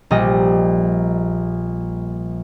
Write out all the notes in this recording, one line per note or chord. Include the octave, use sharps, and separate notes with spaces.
A#1 G3 D#5